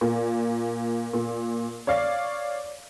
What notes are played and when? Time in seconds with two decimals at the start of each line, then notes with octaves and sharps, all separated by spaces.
0.01 A#2
1.13 A#2
1.87 C#5 D5 F5